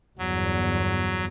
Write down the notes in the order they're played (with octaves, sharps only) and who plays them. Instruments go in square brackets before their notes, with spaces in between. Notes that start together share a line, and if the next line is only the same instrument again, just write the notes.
[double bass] G1 E2 [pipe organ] F#3